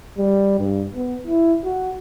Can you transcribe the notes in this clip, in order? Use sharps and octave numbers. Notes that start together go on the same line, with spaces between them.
G3
G2
B3
E4
F#4